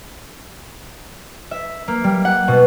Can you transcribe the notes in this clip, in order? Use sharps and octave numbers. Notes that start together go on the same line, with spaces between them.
E5
A#3
G3
F#5
B2